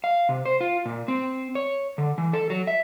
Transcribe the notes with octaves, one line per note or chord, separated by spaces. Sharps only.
F5
C3
C5
F4
A#2
C4
C#5
D3
E3
A4
F#3
E5